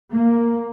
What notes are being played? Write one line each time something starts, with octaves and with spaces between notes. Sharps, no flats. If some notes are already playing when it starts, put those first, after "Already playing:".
A#3